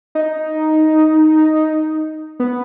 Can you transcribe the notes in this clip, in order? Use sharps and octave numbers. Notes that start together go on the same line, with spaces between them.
D#4
B3